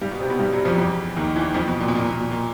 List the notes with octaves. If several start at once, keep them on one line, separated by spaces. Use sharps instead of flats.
G2 G3
B2 B3
C3 C4
B2 B3
G2 G3
F#2 F#3
F2 F3
E2 E3
D#2 D#3
E2 E3
F2 F3
B2
A#2
B2
A#2
B2
A#2
A#2